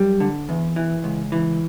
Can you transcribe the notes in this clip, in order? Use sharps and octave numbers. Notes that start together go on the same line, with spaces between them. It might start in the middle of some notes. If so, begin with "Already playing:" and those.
Already playing: F#2 G3
D3
E2
E3
C#2
E3